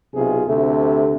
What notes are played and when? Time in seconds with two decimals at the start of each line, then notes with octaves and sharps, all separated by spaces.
0.14 B1 C3 F4 G#4
0.46 D2 C3 A3